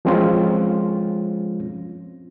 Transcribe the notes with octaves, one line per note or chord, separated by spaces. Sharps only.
F3 G#3 C4 C#4 F4